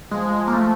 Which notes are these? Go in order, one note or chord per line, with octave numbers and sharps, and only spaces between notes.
F3 G#3
A#3
A3